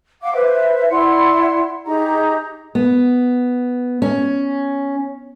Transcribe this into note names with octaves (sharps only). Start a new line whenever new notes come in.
F5 F#5 D6
B4 C5 E5
E4 D5 F#5 C6
D#4 G4 G#4 A#5
B3
C#4